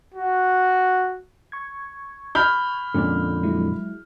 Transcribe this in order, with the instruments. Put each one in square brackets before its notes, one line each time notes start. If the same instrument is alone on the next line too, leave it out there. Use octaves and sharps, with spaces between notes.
[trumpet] F#4
[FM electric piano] C#6 G#6
[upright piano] B5 F6 G6
[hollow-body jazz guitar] F2 A#2 D3 [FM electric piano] G#3 C#4
[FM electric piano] F#3 G#3 E4